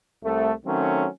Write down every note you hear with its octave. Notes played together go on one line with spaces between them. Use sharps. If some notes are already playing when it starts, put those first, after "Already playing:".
C2 A3
D#3 F#3 A3 C4 C#4